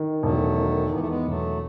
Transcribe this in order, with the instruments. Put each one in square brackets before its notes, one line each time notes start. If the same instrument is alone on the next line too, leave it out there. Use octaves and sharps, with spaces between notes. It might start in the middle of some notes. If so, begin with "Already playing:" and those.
Already playing: [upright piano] D#3
[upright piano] E1 [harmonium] F#3 A3
[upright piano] D#3
[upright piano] E2 [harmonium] B3
[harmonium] A3
G#3 B3
[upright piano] E1 [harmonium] F#3 A3